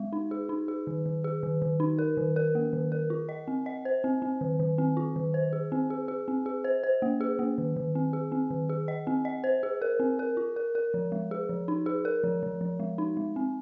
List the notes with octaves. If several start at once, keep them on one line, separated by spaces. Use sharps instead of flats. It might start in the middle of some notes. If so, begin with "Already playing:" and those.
Already playing: G#3
D#4
G#4
D#4
G#4
D#3
D#3
G#4
D#3
D#3
D#4
A#4
D#3
A#4
A#3
D#3
A#4
F4
D#5
C4
D#5
C5
C4
C4
D#3
D#3
C4
F4
D#3
C5
G#4
C4
G#4
G#4
C4
G#4
C5
C5
A#3
G#4
A#3
D#3
D#3
C4
G#4
C4
D#3
G#4
D#5
C4
D#5
C5
G#4
A#4
C4
A#4
F4
A#4
A#4
F3
G#3
G#4
F3
D#4
G#4
A#4
F3
F3
F3
G#3
D#4
G#3
C4